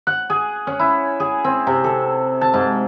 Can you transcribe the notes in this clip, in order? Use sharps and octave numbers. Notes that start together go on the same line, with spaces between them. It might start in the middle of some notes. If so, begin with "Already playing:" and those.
F#5
G#4
C#4
E4
G#4
C4
C3
A4
A5
G#2